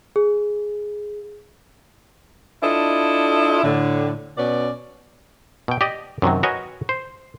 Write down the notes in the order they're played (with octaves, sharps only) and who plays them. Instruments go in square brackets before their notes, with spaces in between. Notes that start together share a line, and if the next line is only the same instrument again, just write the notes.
[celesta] G#4
[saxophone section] D4 E4 F4 A4 D#5
A2 D3
B2 B3 C#4 D5
[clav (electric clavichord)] B2 G5
G4 D5 D#5
F#2 C3 D#3 F#3
F#4 A#4 B4 C#5 D#5 G#5
C5